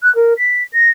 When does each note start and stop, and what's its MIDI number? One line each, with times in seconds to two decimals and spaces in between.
0.02 0.13 90
0.15 0.33 70
0.37 0.63 95
0.72 0.90 94